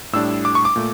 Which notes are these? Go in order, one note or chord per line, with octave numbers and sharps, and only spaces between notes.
A2 G3 D4 E6
D6
C#6
D6
A#2 A3